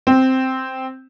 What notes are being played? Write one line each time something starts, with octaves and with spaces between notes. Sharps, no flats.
C4